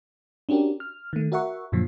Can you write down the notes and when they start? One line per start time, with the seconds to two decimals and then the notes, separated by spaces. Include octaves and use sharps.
0.49 C#4 D4 F#4 G4 A#4
0.80 F6
1.13 D#3 A3
1.32 F#4 A#4 E5 F#5 C#6
1.72 F#2 A#2 D3 F3 F#3